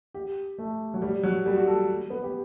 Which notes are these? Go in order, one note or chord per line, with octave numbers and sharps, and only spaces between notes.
G4
A3
F#3
G3
F#3
G3
F#4
A4
B3
G4